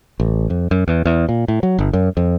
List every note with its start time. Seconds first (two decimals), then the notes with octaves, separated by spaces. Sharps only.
0.20 A1
0.50 F2
0.71 F#2
0.88 E2
1.05 E2
1.29 A#2
1.48 A2
1.63 F#3
1.78 G1
1.93 F#2
2.17 F2